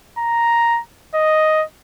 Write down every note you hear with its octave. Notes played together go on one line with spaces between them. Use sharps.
A#5
D#5